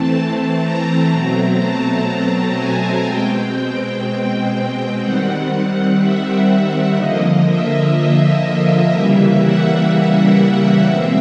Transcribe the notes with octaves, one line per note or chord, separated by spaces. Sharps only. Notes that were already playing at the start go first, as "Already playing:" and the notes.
Already playing: E3 A3 C4 A5
A#5
B2 F#3 A3 C4
A5
G#5
B2 G#3 C4 G5
G5
D#3 G3 C4 F#5
E5
D3 F3 A#3 D#5
E5
D#5
C#3 E3 G3 A#3 E5
F#5
E5
B2 G#3 C4 E5